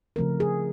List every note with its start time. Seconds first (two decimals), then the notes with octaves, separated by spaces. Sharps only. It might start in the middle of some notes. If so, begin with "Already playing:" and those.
0.16 C#3 F3 A3 C4 A#4
0.40 G#4